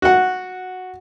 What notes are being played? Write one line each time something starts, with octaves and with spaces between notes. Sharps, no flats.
F#4 F#5